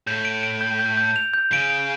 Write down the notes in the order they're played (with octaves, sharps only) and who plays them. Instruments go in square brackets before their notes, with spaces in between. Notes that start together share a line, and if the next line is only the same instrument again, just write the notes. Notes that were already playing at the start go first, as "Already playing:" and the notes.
[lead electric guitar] A2 [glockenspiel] G6
[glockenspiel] D7
D7
G6
G6
G6
F7
G6
[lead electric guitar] C#3 [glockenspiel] D7
[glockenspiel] D7